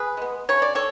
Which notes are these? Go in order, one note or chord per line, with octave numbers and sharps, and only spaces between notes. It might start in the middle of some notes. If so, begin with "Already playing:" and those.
Already playing: G#4 B4
G#3 B3
C#3 C#5
D5
A4 C#5